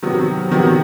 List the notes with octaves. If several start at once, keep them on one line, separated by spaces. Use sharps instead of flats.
C3 D#3 F#3 B3
C3 D#3 F#3 B3